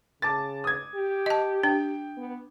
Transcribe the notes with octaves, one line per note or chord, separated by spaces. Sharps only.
C#3 A5 D6 A6
D#6 G#6
G4
D#5 A5
D4 G5
B3